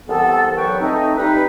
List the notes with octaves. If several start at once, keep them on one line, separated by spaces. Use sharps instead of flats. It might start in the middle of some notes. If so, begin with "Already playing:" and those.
C2 E3 B3 A4
G2 F#3 B4 G5 C#6
A3 C4 D#4
G3 D#4 B4